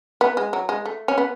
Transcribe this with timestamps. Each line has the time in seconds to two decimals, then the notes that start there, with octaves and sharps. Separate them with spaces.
0.21 B3
0.37 G#3
0.53 F#3
0.69 G#3
0.85 A3
1.08 C#4
1.18 B3